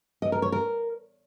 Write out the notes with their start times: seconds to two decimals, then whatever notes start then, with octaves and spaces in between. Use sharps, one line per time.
0.22 D#5
0.32 A#4
0.42 C#5
0.52 A#4